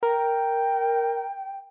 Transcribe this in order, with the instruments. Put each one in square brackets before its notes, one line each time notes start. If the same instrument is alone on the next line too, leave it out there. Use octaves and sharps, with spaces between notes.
[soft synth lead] A#4 [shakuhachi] G5